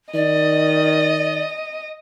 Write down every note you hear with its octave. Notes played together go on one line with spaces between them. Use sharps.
D#3 D5 D#5